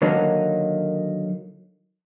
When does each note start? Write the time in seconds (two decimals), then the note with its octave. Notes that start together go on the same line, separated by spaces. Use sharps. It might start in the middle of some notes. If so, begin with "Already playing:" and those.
0.02 D3 D#3 F#3 A#3 D#4